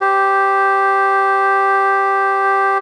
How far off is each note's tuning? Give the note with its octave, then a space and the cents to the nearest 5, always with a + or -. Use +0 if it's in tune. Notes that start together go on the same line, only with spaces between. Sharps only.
G4 +0 C5 +0